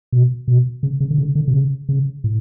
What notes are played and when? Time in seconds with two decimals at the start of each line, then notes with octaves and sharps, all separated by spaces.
0.12 B2
0.48 B2
0.83 C#3
1.00 C#3
1.11 D3
1.18 C#3
1.35 D3
1.48 C3
1.54 C#3
1.89 C#3
2.24 A2